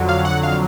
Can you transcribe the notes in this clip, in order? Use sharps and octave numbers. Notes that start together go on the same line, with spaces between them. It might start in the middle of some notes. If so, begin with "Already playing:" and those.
Already playing: F2 D3 F#3
F5
F#5
F5